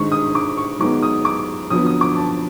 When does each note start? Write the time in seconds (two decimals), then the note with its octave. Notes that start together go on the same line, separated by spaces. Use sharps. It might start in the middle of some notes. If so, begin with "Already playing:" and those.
Already playing: G#1 G2 D#3 G#3 C#6
0.12 D#6
0.35 D6
0.57 C#6
0.79 F#2 D#3 G#3 B3 D6
1.02 D#6
1.25 D6
1.70 F2 D3 F#3 B3 D#6
1.87 D#6
2.01 D6
2.17 A5